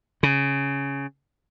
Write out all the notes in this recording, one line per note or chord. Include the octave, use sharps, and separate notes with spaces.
C#3